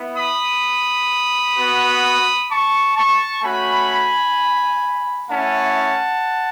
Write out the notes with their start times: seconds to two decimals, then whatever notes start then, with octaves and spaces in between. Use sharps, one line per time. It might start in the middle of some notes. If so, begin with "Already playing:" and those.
Already playing: B3 E4
0.16 B5 D#6
1.56 B3 F#4
2.49 A5 C#6
2.96 A5 C#6
3.42 A3 C#4 F#4 G#5 B5
5.29 A3 C#4 E4 F#5 A5